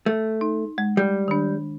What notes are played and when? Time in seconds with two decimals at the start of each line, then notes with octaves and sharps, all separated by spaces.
0.06 A3
0.41 D#4
0.78 G#3
0.97 G3
1.28 D#3 D4